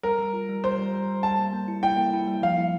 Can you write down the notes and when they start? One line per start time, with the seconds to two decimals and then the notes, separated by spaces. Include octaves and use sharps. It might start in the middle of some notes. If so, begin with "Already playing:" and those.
0.03 G3 A#4
0.19 G3
0.33 F4
0.49 G3
0.64 G3 C5
0.78 G3
0.93 G3
1.09 G3
1.23 G3 A5
1.38 A#3
1.53 A#3
1.68 E4
1.83 E4 G5
1.98 A#3
2.13 E4
2.28 G3
2.42 F3 F5
2.58 E4